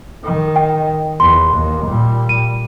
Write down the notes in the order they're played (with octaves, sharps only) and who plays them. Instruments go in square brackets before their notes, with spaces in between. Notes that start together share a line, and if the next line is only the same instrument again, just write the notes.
[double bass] D#3
[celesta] G5
[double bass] E2 [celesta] C6
[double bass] D#2
A#2 G3
[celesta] D#7